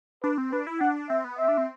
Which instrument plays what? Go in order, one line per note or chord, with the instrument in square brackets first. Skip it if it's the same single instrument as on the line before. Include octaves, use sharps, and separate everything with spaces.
[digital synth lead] D4 [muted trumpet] B4
[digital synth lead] C4
[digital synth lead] D4 [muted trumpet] B4
[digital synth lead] E4
[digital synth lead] D4 [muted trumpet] F#5
[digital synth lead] C4 [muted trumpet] E5
[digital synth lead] B3
[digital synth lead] C4 [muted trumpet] E5
[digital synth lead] D4
C4